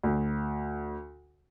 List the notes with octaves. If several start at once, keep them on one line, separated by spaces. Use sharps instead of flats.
D2